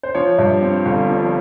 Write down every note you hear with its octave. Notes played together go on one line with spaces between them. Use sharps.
C5
F3 C#5
G2
C4
G1
F3